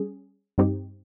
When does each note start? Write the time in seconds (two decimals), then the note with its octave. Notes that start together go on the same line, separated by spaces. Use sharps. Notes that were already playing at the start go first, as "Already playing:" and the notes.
Already playing: G3 C#4 G#4
0.58 G2 G3 C4 D#4 G4